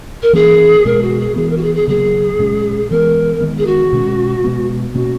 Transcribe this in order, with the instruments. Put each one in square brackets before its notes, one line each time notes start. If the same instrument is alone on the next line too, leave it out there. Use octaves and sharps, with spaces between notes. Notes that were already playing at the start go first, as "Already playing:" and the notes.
[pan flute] A#4
[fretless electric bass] E3 A#3 C#4 [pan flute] G#4
[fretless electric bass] B2 G#3 B3 [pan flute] A#4
[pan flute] F#4
G#4
[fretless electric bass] E3 B3 [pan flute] G#4
[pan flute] A#4
F#4
G#4
G#4
[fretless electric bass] C#3 F#3 A#3 [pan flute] G#4
[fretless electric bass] A#2 G#3 C#4
[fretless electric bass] E3 G#3 B3 [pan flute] A#4
[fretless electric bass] D#3 G#3 B3
[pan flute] G#4
F#4
[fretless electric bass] B2 G#3 C#4
B2 G#3 B3
[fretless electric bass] B2 A#3 C#4 [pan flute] F#4